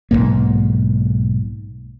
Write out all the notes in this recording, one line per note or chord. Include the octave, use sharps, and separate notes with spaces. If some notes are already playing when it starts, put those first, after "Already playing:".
B1 F2 G#2 A#3